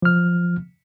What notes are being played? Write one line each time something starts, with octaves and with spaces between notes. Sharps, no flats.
F3 F6